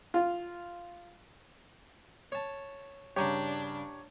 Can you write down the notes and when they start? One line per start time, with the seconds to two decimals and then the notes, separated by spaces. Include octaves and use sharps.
0.14 F4
2.32 C#5 A5
3.16 G2 C#3 D4 G4 C#5 A#5